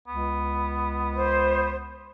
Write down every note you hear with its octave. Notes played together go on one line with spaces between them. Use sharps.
C#2 B3
C5